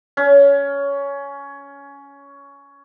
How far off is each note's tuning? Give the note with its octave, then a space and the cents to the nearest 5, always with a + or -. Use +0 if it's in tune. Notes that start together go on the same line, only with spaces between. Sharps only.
C#4 +15